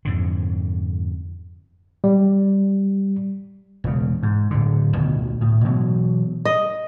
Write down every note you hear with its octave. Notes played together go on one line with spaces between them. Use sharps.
F2 G#2 D3
G3
E1 C#3
G#2
D1 D3
D2 B2 D#3
A2
B2 E3 F#3
D#5